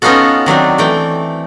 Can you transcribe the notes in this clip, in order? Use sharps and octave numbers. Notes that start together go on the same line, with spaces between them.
B3 C#4 D#4 F4 F#4 A4
D#3 F#3 C4 D4
E3 A3 G5